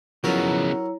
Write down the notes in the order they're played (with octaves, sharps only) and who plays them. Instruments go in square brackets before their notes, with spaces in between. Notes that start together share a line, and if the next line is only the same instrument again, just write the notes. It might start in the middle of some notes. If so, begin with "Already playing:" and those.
[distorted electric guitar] C#3 B3 [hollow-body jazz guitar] F3 [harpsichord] F#3 A#4 [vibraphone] E4 C#5 A#5